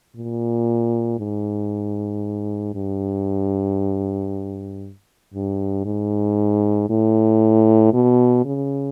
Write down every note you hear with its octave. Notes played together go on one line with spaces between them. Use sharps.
A#2
G#2
G2
G2
G#2
A2
B2
C#3